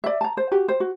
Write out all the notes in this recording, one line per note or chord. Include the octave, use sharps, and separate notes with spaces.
D5 E5
A5 A#5
C5
F#4 G4
C5
F#4